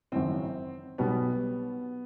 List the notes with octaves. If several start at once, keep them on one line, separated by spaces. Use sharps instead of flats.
G#1 F#2 C#3 E3 C4
B1 B2 G3 B3